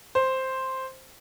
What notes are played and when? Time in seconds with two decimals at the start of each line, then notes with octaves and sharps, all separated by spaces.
0.15 C5